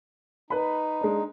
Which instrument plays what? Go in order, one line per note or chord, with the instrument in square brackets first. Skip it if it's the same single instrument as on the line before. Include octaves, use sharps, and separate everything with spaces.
[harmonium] D#4 [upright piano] B4 B5
[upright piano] G#3 D4